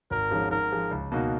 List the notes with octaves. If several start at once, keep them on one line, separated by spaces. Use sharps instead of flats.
G#1 A#4
G#2 F3 G#3 C#4
G#2 A#4
F3 G#3
C#2
B2 A#3 D#4 F#4